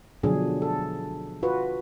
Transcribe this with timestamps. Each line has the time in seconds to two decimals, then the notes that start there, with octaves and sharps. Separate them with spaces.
0.23 B2 D3 F3 F#3 D4 G#4
0.62 A4
1.43 F4 F#4 B4